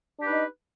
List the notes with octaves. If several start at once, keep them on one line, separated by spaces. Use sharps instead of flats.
D4 D#4 G4 B4 D#5